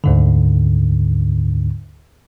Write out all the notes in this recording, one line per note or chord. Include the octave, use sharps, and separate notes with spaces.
D2 G#2 D3